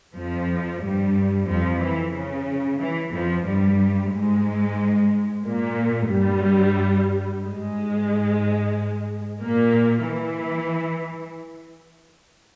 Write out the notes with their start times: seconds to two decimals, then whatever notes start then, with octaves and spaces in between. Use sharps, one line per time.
0.16 F2 F3
0.82 G2 G3
1.48 F2 F3
1.81 E3
2.14 C#3
2.81 E3
3.13 F2 F3
3.47 G2 G3
4.12 G#2 G#3
5.44 A#2 A#3
6.11 G2 G3
7.44 G#2 G#3
9.42 A#2 A#3
10.08 E3